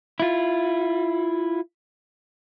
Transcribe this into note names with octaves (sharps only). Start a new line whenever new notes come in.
E4 F4